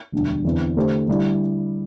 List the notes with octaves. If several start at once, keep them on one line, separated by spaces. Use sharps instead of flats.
E1 D2 D3 G3 D4
E2 D3 C4 E4
D3 A3 D4 G4 C5
D3 G3 E4